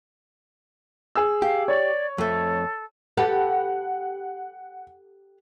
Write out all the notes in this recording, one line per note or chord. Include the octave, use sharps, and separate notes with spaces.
G#4 E6
G4 F5
C#5 D5 C#6
F2 A3 A4
G4 A4 B4 F#5